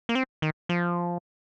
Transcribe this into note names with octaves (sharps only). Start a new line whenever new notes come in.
A#3
C4
D#3
F3